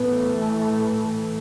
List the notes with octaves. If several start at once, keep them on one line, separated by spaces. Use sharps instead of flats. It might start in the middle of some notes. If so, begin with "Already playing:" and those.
Already playing: A2 E3 A3 B3